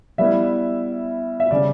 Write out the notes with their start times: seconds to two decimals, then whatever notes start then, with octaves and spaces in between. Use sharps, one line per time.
0.18 G3 B3 E4 E5
1.40 E5
1.51 C#3 G3 D5